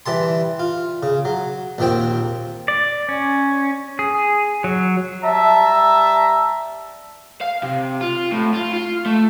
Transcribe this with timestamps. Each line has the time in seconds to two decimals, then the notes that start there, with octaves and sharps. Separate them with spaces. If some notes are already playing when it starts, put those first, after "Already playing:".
0.06 E3 G3 A5 C6
0.59 F4
1.03 C#3
1.25 F#3
1.78 A#1 D#2 F3 C4 G5
2.68 D5
3.09 C#4
3.99 G#4
4.64 F#3
5.23 G3 E5 A5 A#5
7.41 F5
7.63 C3
8.01 F4
8.32 A2
8.54 F4
8.74 F4
9.06 A3